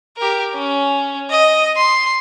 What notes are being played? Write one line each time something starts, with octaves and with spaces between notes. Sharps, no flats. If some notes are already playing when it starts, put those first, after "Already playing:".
G4 A#4
C#4
D#5
C6